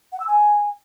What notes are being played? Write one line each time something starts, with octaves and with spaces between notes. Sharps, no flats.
F#5
E6
G#5